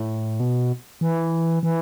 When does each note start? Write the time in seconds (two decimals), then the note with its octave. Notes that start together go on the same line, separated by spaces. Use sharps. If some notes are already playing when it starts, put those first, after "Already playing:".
Already playing: A2
0.40 B2
1.01 E3
1.63 E3